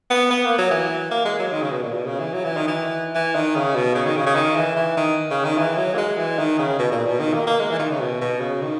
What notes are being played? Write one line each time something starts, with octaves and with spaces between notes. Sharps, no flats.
B3
B3
A#3
F#3
E3
A#3
G#3
F#3
D#3
C#3
B2
A#2
B2
C#3
E3
F#3
E3
D#3
E3
E3
D#3
C#3
B2
C#3
D#3
C#3
C#3
D#3
E3
E3
D#3
C#3
D#3
E3
F#3
A#3
G#3
E3
D#3
C#3
B2
A#2
B2
D#3
A#3
A#3
G#3
E3
D#3
C#3
B2
B2
C#3
D#3